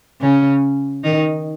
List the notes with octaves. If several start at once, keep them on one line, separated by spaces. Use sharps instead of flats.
C#3 C#4
D#3 D#4